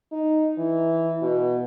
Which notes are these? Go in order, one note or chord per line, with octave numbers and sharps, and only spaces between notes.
D#4
E3
B2